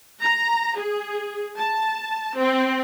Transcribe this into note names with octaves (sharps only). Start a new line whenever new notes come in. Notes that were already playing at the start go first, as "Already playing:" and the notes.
A#5
G#4
A5
C4